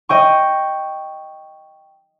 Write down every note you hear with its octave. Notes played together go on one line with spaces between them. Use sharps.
D#5 G5 C#6